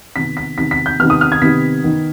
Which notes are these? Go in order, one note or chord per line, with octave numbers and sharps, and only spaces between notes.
C3 D#3 B3 B6
B6
C3 D#3 B3 B6
B6
G6
C3 D#3 B3 F6
D#6
F6
G#6
C3 D#3 B3 B6
D#3 B3